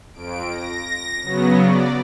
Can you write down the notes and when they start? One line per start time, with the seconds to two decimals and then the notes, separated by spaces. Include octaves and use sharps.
0.13 F2 D7
0.50 A#6
1.23 C#3 F#3 B3
1.63 D5